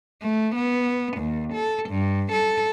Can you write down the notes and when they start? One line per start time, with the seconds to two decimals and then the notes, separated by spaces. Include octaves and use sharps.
0.22 A3
0.55 B3
1.18 D#2
1.54 A4
1.90 G2
2.32 A4